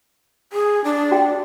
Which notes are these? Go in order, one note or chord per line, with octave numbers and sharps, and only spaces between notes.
G#4
D4
F#4 G5